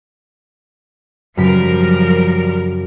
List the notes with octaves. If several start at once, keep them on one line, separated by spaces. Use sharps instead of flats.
F#2 C#3 F3 G3 A#4 B6